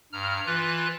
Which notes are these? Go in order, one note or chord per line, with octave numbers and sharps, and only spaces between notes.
G2 A#5 F6
E3 F4 B4 F#6